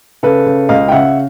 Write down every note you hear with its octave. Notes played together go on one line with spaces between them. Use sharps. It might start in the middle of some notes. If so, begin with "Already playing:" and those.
C#3 A4 B4
C#3
C#2 D#5 F5
G5
C#3 E5 F#5